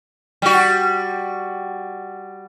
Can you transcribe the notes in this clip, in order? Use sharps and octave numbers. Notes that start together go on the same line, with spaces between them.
G3 F#4